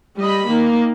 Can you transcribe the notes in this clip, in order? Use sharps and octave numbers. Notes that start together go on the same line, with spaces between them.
G3 D#5 B5
D#3 A#3